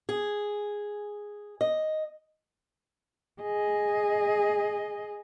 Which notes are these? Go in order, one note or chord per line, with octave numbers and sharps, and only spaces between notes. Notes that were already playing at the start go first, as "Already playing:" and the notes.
G#4
D#5
G#4 D#5